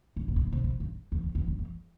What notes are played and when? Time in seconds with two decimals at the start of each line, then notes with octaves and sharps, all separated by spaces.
0.16 G2
0.28 A2
0.36 G2
0.40 A2
0.52 C3
0.64 C3
0.80 G2
1.12 E2
1.23 E2
1.35 E2
1.48 G2
1.59 E2